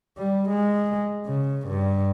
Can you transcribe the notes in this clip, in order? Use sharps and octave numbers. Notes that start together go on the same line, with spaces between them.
G3
G#3
C#3
G2